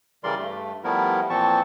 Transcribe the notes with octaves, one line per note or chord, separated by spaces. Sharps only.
C#3 E3 G3 A#4 D5 C6
G2 A3
F3 G3 A3 B3 E4 A#4
A#2 E3 F3 C4 A5 C#6